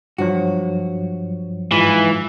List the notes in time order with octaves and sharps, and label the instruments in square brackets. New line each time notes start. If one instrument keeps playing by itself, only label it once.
[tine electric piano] G2 F3 F#3 [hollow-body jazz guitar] F#4
[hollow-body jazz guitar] G#2 F4 [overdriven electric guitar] E3